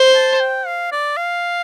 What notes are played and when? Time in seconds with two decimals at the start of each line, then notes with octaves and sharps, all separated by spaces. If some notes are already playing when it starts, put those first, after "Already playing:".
Already playing: C5
0.15 A5
0.40 G5
0.66 F5
0.92 D5
1.17 F5